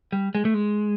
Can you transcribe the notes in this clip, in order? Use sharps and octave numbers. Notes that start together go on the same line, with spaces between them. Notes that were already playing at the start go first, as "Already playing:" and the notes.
G3
G#3
A3
G#3